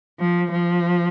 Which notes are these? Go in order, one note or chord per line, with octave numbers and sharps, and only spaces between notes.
F3
F3